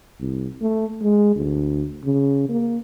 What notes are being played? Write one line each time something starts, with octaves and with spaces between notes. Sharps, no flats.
C2
A3
G#3
D2
C#3
A#3